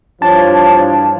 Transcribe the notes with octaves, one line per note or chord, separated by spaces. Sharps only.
G2 E3 F3 D4 C#5 A5